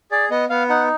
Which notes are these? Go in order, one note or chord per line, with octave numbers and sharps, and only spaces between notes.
G#4 D5
B3 D#5
B3 F5
D#4 F#5